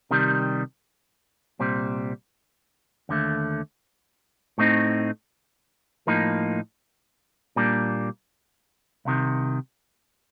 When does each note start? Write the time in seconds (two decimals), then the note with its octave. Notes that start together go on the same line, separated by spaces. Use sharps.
0.11 C3 D#3 G3
1.59 C2 A#2 G3 C4
3.09 D#2 D3 A3
4.58 A2 A3 C4 D#4
6.07 A2 F3 A#3 D#4
7.56 A#2 G3 A#3 D4
9.05 C2 C3 D#3